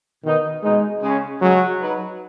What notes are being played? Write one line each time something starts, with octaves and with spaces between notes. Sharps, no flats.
B2 D#3 B3 D#4
B2 G#3 B3 D#4
C#3 G#3 C#4
C#3 F#3 G#3 C#4 F#4 C#5
F#3 D#4 B4